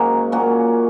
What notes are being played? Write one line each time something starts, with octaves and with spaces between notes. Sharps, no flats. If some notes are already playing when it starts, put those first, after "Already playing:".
Already playing: G#2 C#3 F#3 A#3 C#4 F#4
A#2 A#3 C#4 F#4